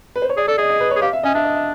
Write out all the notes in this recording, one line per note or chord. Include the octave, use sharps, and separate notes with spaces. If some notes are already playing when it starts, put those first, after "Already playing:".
B4
C5
C#5
G#4 D5
A4 D5
G#4 D#5
D#5
B4
C#5
G#4
G4 F5
E5
C#4 D#5
D4 E5
D#5
E5